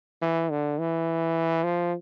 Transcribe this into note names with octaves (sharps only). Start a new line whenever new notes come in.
E3
D3
E3
F3